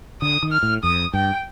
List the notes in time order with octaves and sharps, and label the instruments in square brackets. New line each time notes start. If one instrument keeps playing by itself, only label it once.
[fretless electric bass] D3 [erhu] D#6
[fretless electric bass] D#3
[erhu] F6
[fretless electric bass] A2
[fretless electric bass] F2 [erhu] D#6
[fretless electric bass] G2 [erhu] G5